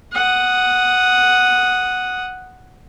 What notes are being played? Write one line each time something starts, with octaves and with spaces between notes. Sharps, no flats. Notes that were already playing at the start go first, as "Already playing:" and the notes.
F#5 D#6